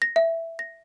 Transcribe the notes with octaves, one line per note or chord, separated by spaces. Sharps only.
A#6
E5
A#6